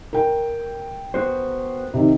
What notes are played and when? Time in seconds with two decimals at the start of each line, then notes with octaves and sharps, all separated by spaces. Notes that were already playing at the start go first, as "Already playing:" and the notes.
0.13 A#4 G5
1.14 B3 F#4 C5
1.94 C3 D#3